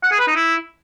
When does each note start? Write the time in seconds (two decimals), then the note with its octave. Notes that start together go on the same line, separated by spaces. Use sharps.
0.03 F#5
0.11 G#4
0.19 B4
0.27 D#4
0.35 E4